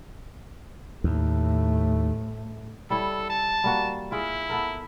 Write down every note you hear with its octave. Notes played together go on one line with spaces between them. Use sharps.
D#2 A2 A3
G3 E4 A4 C#5
A5
G3 A#3 F#4
E4 F4 G#4
B3 A4 A#4